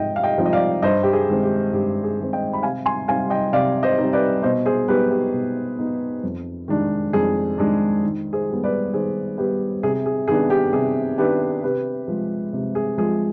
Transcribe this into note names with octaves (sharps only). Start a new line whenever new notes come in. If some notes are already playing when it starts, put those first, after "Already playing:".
Already playing: G#2 F3 C4 D#5 G5
F5
D#5 G5
F3 C4 D#4
D#5
D5 F5
G2 C5 D#5
G4
G#4
D#3 G#3 C4
G4
G2 G4
G#4
D#3 G#3 C4
D#5 G5
B5
C3 F5 G#5
G#5 C6
G3 C4 D#4 F5 G#5
D#5 G5
C3 D5 F5
C5 D#5
G3 C4 D#4
B4 D5
B2 C5 D#5
G#4 C5
B3 D#4 G4 B4
G4
B2
B3 D#4
F2
D#3 G#3 D4
F2 G#4
D#3 G#3 D4
D#3
G#4 C5
G3 B3
B4 D5
D#3 G#4 C5
G3 B3 G4 B4
C3 G#4
G#4
D#3 B3 D4 G#4
G4
C3 G#4
D#3 B3 D4 G4 B4
C3 G4 B4
F3 G#3
C3
G#4
F3 G#3 G#4